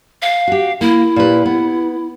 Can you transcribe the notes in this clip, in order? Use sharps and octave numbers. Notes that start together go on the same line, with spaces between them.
F5
F#4 G4
A#3 E4
A#2 G4 B4
B3